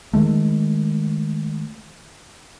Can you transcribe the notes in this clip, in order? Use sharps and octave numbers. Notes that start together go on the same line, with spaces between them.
D#3 G#3 A3